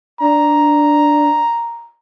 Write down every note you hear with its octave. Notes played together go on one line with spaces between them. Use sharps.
D4 A#5